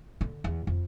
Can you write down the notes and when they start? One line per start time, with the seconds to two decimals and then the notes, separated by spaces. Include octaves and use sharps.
0.21 D3
0.44 E2
0.67 F2